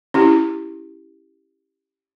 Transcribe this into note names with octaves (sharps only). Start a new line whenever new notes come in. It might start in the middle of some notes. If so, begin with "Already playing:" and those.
C#4 E4 G4